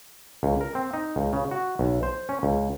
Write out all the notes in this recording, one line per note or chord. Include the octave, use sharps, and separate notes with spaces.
C#2
A#4
C4
D#4
C#2
C#3
F#4
B1
C5
C#4
C#2